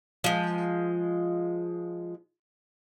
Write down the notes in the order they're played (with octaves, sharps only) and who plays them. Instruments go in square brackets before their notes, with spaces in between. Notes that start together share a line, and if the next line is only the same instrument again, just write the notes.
[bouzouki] F3 G#3